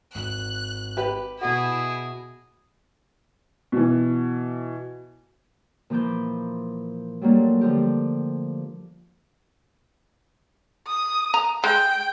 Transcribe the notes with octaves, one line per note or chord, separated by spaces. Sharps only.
G#1 F#6
G4 B4
B2 E4 F#4 G#4
B2 E3
A#2 E3 F3 B5 D6 G6
F#3 G3 A3 A#3 D4 F4
D3 F3 F4 G4
D#6
A#5
G#3 G5